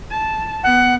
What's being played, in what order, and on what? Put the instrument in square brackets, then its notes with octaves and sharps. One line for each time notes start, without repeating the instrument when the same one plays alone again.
[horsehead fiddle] A5
[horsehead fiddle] B3 [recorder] F#5